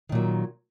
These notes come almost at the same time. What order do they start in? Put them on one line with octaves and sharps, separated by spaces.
D#3 A#2 F#3